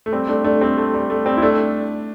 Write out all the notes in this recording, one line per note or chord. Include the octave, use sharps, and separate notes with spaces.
A3
G3 C4
A3 D4
A3 D4
G3 C4
A3
G3
A3
G3 C4
E4
A3 D4